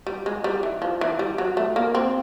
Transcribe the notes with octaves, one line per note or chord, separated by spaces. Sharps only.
G3
G#3
G3
E3
F3
E3
G3
F#3
A3
A#3
C4